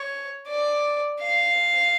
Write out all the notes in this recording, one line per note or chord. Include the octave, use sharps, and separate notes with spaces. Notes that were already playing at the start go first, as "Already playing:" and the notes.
Already playing: C#5
D5
F5